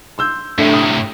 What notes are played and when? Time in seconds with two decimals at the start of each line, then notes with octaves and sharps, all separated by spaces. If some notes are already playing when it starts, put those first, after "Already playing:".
0.18 C6 E6 G6
0.58 A2 C3 A3 D4 E5
0.74 D#6